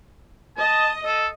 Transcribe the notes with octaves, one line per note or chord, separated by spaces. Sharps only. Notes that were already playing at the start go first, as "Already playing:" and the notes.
D#5 A5
A4